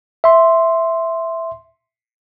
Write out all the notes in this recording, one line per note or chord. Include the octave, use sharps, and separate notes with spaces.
E5 C6